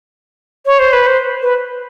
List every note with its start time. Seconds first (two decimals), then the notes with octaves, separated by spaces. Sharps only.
0.66 C#5
0.79 C5
0.93 B4
1.07 C5
1.42 B4